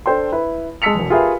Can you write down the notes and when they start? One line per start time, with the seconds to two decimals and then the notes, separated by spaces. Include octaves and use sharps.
0.06 D4 A4 C5 G5 C6
0.32 E4 B4
0.82 G#3 A5 E6 B6 C#7 F7
0.95 E1 E2
1.10 F4 G4 G#4 A#4 B4 E5